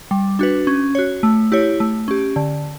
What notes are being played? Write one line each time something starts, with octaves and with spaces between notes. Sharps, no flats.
G3
D4 F#4 B4
C#4
F#4 C#5
A3
E4 G4 C#5
A3
C#4 G4
D3